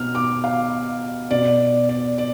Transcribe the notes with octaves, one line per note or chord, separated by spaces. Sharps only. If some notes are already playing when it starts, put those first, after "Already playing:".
Already playing: B2 F6
D6
F5
B2 D5
D5
D5